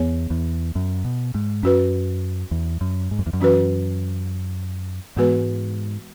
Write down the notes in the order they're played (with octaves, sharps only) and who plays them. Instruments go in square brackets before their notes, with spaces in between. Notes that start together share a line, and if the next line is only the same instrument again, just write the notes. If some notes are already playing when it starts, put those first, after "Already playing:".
Already playing: [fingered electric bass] E2 [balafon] B3 G#4 C#5
[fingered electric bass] E2
F#2
B2
G#2
[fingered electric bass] F#2 [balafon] C#4 F#4 B4
[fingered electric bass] E2
F#2
G#2
F#2
E2
F#2
[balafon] E3 C#4 F#4 B4
[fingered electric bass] G#2 [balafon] E3 G#3 B3 F#4 B4